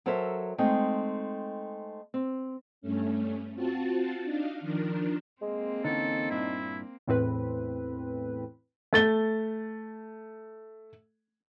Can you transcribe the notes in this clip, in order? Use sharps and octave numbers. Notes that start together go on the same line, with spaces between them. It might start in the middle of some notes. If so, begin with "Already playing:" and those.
F#3 A4 A#4 C5 C#5 E5
G#3 A3 C4 D#4
C4
G2 A3 C#4
C4 F4 F#4 A5 A6
D4 D#4 F5
D#3 F3 D4 A#4
G#3 A#3 C4
D3 E3 C#4 D#4 A4
G2 A#2 D4 E4
E2 A2 C4 B4
A3 A6 G7